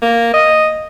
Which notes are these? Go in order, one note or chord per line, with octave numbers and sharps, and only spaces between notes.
A#3
D#5